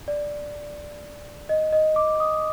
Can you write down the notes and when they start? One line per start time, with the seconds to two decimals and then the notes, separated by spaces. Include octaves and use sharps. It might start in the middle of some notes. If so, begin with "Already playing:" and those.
0.08 D5
1.49 D#5
1.73 D#5
1.96 D6
2.20 D#6